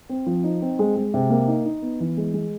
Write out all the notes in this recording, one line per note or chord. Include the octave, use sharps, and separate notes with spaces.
C4
F3
D#4
C4
G#3
G#3
C3
A#3
D#4
D#4
B3
E3
G#3
G#3